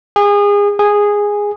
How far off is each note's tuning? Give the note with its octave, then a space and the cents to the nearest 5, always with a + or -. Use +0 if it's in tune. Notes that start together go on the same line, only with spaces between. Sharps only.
G#4 -30
G#4 -10